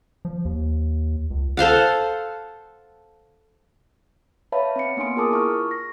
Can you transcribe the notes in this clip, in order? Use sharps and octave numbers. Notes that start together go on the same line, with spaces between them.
F3
D#2
C#2
A4 C5 F5 F#5
B4 C#5 E5 F5 A5 B5
C4 C#7
A#3 B3 D4 G#5 C6 D7
F4 G#4 A#4 A5 D6 D#6
E4 C#6 F6
A#6